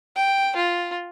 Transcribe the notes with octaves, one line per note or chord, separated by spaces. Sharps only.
G5
F4